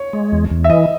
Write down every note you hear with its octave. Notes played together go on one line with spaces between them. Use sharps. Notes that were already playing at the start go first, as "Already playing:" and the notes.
Already playing: C#5
G#3
E2
E2
E5
E3 D#5